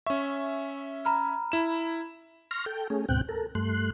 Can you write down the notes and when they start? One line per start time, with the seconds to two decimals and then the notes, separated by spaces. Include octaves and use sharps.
0.06 C#4 E5 C#6
1.05 A#5 B5 F6
1.52 E4 E7
2.51 C6 C#6 F6 A#6
2.66 A4 G5
2.90 A3 C#4 G#4
3.09 D2 G#2 B2 C4 G5 F#6
3.29 A4 A#4
3.55 G2 A3 C6 F#6